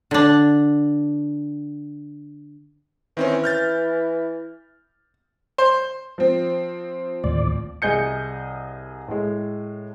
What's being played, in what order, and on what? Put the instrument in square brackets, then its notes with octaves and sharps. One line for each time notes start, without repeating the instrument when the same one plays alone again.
[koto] D3 D4
[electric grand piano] D#3 C4 C#4 [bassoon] E3
[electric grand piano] F6 G6 A6
[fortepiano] C5
[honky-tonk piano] F3 C4
[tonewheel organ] D#2 A2 D5
[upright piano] C2 G#4 D#5 G6 C#7
A2 G#3